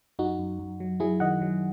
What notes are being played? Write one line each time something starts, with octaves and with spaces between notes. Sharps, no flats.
F#2 D#4 F#4
F#2
F#2
F#3
F#3 E4 G#4
D#3 D#5 F#5
F#3